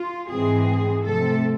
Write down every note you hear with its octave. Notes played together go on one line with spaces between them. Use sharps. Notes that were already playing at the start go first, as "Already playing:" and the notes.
Already playing: F4
G#2 E3 G#3 C4 G#4
C3 F3 A3 A4